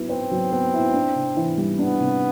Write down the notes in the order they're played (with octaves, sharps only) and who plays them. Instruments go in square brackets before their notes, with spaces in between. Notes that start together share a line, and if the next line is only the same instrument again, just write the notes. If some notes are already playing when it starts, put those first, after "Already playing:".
Already playing: [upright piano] F#3 B3 E4
[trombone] C4 [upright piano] B4
[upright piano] F#3
B3
E4
D4
C3
E3
G3
[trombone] B3 [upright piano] D4
[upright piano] C3